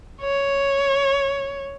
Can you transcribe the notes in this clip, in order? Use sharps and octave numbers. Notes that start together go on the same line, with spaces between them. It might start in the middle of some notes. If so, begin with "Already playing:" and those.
C#5